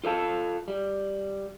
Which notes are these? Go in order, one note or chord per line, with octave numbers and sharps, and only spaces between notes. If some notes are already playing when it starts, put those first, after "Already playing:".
F4 A4 F5 A5
G3